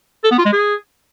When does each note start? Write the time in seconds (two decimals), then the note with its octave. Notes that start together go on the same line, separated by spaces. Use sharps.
0.24 A4
0.31 B3
0.38 F4
0.45 G#3
0.53 G#4